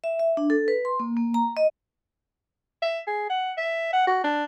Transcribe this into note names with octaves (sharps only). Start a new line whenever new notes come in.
E5
E5
D4
A4
B4
C6
A#3
A#3
A#5
D#5
E5
G#4
F#5
E5
F#5
F#4
D4